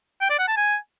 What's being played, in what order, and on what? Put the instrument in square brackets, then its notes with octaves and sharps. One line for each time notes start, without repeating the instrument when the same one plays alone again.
[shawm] G5
D5
F#5
A5
G#5